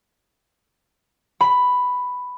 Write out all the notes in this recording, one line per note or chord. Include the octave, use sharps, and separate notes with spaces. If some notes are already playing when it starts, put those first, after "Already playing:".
B5